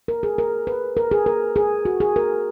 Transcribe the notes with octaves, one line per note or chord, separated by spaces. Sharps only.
A#4
G#4
A#4
B4
A#4
G#4
A#4
G#4
F#4
G#4
A#4